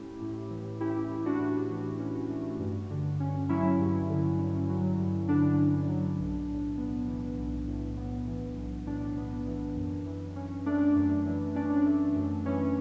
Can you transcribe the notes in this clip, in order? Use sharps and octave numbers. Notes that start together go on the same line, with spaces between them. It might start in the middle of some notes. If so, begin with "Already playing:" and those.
Already playing: A2 A3 C#4 E4 G4
A2
E3
C#4 E4 G4
A3
D4 F#4
A2
E3
C#4
A3
G2
D3
C#4
F#3 C#4 E4
G2
D3
C#4
F#3
G2
D3 D4
C#4
F#3
B1
A2
B3
E3
B1
A2
B3
E3
B1
A2 D4
B3
E3
F#2
E3
C#4
A3 D4
F#2
E3
C#4 D4
A3
F#2
E3 C#4